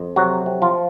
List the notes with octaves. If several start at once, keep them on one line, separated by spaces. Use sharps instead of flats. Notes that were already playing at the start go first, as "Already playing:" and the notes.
Already playing: F2
C3 F#3 F#4
C3
F3 F4